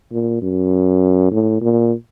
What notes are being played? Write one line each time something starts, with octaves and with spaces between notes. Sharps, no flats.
A#2
F#2
A2
A#2